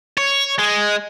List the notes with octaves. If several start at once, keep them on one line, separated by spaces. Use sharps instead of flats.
C#5
G#3